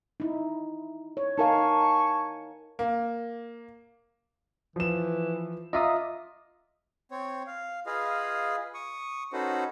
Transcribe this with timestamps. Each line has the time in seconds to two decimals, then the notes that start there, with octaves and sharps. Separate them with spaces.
0.20 D#4 E4
1.17 C#5
1.37 D#4 A#4 F5 G#5 A5 C#6
2.79 A#3
4.76 E3 F3 E7
5.73 F4 D#5 E5 A#5 D6 D#6
7.12 C4 C#5
7.47 F5
7.86 F4 G#4 B4 D#5 F5
8.74 C#6 D#6
9.33 C#4 D#4 F#4 A4 B4 C5